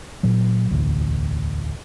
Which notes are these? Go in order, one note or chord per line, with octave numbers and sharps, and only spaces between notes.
A#2 F#3
E1 A1 D2